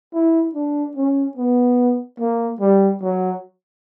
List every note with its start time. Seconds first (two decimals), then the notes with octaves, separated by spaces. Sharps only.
0.14 E4
0.55 D4
0.96 C#4
1.37 B3
2.20 A#3
2.61 G3
3.03 F#3